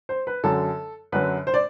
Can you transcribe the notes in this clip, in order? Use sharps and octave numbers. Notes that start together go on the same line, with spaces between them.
C5
B4
F#2 D3 F#3 A4
F#2 D3 F#3 B4
C5
D5